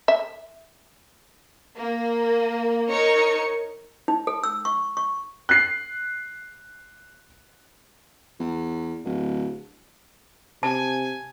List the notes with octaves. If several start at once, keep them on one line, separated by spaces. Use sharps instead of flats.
E5
A#3
D#4 A#4 C#5 C#7
D#4
A4
E6
C#6
C#6
F#6 C7
E2
D1
C3 G#5 A5